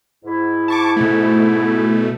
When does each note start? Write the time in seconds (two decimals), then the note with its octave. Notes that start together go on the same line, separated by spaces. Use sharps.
0.24 G#2 E4
0.68 A5 C#6 D6
0.97 B2 A3